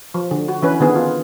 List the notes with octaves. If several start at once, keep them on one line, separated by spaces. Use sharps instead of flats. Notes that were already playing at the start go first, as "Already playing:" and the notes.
F3
D3
F#4
E3 C#4 B4
D3 D#3 B3 G#4
F4